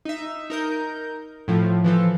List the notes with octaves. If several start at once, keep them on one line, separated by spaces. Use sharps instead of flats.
D#4 E5
D#4 A#4 G6
A2 F3
E3 F3 A4